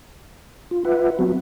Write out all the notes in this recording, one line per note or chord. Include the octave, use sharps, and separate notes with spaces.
F4
F4 B4 E5 F#5
F#3 B3 C4 F#4